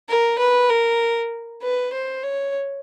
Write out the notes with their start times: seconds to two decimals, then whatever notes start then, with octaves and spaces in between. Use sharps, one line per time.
0.09 A#4
0.39 B4
0.70 A#4
1.63 B4
1.93 C5
2.23 C#5